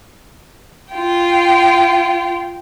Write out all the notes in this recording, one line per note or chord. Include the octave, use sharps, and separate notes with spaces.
F4 G5